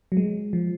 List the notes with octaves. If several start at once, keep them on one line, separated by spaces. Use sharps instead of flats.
F#3
G#3
F3